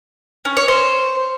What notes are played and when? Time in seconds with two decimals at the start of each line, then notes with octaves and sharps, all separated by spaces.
0.45 C#4
0.57 C#5
0.68 C5